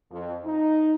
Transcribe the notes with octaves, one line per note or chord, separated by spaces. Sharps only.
F2
D#4